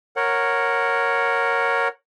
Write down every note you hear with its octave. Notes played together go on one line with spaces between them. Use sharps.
A#4 C#5 F#5